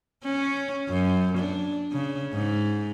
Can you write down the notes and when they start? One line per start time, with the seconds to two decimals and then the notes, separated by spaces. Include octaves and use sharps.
0.24 C#4
0.89 F#2
1.37 D4
1.92 C#3
2.33 G#2